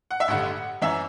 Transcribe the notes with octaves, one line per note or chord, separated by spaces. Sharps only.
F#5
E5
A1 G2 D3 F#5
F#2 E3 E5